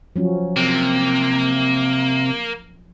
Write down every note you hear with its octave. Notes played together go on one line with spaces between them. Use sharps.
F3 F#3 C#4
C3 A#3